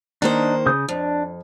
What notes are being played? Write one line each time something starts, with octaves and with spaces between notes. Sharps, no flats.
D#3 A#3 D4 D#4 C5
C#3 D#6 G6
F2 D4